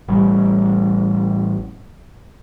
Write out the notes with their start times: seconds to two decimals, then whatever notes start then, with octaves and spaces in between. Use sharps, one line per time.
0.08 A1 G3